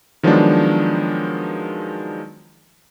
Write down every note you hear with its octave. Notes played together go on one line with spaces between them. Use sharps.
D#3 F3 F#3 G#3 B3 D4